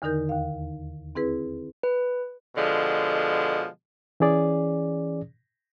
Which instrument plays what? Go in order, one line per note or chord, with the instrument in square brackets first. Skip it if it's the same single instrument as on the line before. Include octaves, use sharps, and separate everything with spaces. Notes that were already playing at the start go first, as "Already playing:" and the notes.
[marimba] E2 D3 D#3 D#4 A#4 G6
D#2 F5
C4 E4 G#4 B4
[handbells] B4
[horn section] B2 D3 F3 G#3
[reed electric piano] E3 C#4 G#4 D5